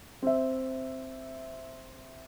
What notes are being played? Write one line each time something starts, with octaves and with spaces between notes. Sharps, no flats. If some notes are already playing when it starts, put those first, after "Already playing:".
C4 E5